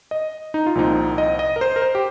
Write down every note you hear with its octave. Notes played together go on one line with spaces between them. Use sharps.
D#5
D#4
F4
C2 A#2 F3 C4 D#4
D#5
D#5
A#4
C5
A#4
C5
G4